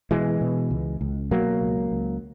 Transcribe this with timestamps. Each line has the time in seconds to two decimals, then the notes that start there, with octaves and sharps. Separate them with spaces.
0.11 B2 E3 G#3
0.41 B2
0.71 C#2
1.01 C#2
1.31 B2 F#3 A#3
1.61 C#2
1.92 C#2